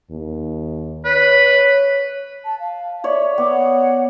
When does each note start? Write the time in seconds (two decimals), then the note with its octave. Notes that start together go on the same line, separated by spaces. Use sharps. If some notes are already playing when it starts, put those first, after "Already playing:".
0.10 D#2
1.05 B4 C#5
2.45 A5
2.59 F5
3.04 C#5 D5 E5
3.38 B3 D6
3.52 F#5